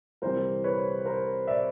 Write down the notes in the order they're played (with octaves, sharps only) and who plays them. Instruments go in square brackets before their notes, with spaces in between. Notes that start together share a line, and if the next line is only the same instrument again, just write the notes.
[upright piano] C2 C3 E3 A#4 C5
B4 C#5
A#4 C5
D5 E5